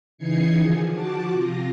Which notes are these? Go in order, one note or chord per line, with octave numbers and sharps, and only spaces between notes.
C#3 E3 D#4 G#6 C7 C#7
D3 D#3 F3 G#4
F3 F#4 A5 D6
C3 F4 A#6